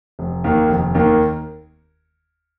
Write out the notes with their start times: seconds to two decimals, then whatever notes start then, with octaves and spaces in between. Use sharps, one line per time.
0.19 F1
0.44 D#2 D#3 A#3
0.69 F1
0.95 D#2 D#3 A#3